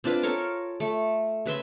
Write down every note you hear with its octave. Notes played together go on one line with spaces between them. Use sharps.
C4 D4 F4 B4
A4 A#4 C#5 A5
A3
C#3 B4 E5 C6